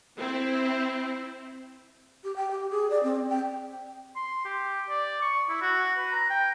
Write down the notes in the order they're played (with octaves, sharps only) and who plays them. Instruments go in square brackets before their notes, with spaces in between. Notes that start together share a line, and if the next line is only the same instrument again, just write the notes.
[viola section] C4 E4
[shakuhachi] G4
G5
G4
G#4
D5
C4
G5
[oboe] C6
G4
D5
C#6
E4
F#4
B4
A#5
G5